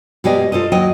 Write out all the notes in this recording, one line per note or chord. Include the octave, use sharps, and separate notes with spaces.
B2 G#3 G4 D5 D#5
F4 A4 C5 D#5
D#2 F#3 D#5 G5